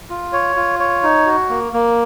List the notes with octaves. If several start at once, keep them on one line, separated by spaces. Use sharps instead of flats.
F4
C#5
F4
C#5
D#4
F#4
A#3
A#3